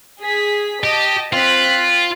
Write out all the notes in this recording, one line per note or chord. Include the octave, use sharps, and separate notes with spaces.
G#4 B6
G4 D#5 A5
C4 F4 F#6 B6